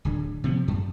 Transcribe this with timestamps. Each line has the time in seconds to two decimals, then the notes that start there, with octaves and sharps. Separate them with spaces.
0.05 D1 D3
0.44 C3 F3 B3
0.68 F#2